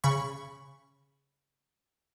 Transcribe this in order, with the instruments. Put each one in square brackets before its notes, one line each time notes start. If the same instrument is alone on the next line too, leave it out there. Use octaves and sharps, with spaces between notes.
[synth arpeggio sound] C#3 B5 C#6